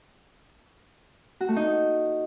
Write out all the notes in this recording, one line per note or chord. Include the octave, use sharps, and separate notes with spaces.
F#4
A3
D#4